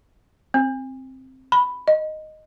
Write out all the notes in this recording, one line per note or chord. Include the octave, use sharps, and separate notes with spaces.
C4
B5
D#5